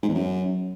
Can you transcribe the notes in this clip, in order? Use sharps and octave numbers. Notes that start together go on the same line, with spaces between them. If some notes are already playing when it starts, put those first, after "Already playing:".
G#2
E2
F#2